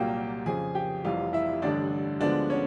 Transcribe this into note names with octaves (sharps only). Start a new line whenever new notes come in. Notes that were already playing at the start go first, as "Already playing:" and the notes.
Already playing: C2 A#2 F#3 A#3 G4 G5
F2 C#3 F3 G#4 G#5
G4 G5
F1 F2 C3 E3 G3 F4 F5
E4 E5
A1 G2 D3 D4 D5
D2 D3 F3 G#3 B3 D4 D5
C#4 C#5